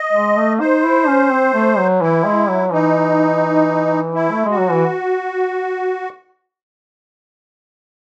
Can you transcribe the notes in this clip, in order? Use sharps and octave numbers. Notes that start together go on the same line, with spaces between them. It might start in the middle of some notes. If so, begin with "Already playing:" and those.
Already playing: D#5
G#3
A3
D#4 C5
E4
C#4
C4
A3
F#3
E3 E4
G#3
F#3
E3 D#4
E4
A3
G#3 F#4
F#3
E3